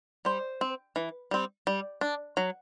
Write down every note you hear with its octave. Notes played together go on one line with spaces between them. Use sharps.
G3 C5
C4
E3
G3 C4
G3
D4
F#3